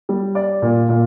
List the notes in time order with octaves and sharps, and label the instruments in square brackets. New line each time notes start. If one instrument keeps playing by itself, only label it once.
[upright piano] G3
D5
A#2
A#2